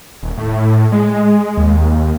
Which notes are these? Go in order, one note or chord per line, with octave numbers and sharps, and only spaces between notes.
D#1
A2
G#3
D#2